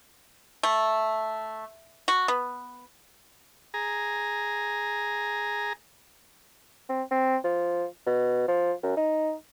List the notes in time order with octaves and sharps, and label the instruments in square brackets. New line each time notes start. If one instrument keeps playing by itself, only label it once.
[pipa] A3
F#4
B3
[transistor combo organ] G#4 A#5
[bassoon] C4
C4
F3
B2
F3
F#2
D#4